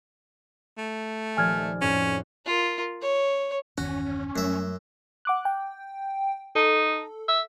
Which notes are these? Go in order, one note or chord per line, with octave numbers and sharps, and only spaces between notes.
A3
D#1 F3 D5 G#5 F6 G#6
F2 A2 C#4 F#4
F4 A#4
C#5
G1 E2 D#3 C#4 F#4
F#2 F#3 G3 A3 E5
F#5 D6 F#6
G5
D#4 A4
E5